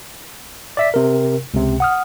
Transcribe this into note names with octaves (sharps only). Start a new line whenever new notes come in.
D5 E5 B6
C3 A#4
C#2 C3
F#5 D#6 F6